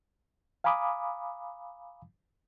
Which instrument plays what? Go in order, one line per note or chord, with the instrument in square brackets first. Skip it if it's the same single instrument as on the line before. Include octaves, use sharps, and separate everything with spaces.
[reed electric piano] F5 G#5 A#5 B5 D6 D#6